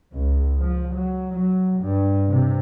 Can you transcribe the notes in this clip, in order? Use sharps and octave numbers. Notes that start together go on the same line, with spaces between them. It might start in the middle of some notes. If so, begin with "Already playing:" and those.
C#2
F3
F#3
F#3
G2
C3